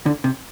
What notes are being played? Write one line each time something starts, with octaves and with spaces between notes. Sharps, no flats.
D3
C3